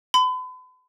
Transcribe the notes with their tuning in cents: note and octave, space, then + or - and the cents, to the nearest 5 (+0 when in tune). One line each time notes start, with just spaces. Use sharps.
B5 +40